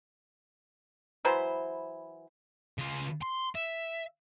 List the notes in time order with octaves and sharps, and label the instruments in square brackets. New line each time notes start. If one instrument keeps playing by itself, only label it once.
[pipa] E3 F#3 C5 B5
[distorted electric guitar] C#3 F4
C6
E5